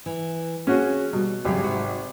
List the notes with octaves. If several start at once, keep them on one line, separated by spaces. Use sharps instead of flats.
E3
A#3 C#4 F#4 G#4
B2 G3
G#1 C#3 F#3 G4
G#2 C3 F#4